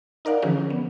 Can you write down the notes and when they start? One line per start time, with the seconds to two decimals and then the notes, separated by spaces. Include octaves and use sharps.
0.25 D#4 A#4 D5 F5 F#5
0.42 D3 E3 F3 C#4 G#4
0.70 B3